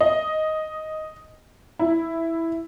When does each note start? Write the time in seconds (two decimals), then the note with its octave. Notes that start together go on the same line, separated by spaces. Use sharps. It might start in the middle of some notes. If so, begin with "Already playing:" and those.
0.01 D#5
1.79 E4